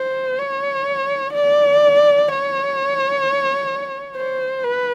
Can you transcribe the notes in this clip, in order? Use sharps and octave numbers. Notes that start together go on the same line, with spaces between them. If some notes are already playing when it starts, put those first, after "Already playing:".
Already playing: C5
C#5
D5
C#5
C5
B4